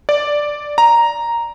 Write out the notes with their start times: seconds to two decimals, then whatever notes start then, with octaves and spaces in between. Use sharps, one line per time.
0.09 D5
0.78 A#5